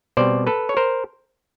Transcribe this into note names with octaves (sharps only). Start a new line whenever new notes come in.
B2 G3 C4 C5 D5
A4 B4
C#5
A#4 C5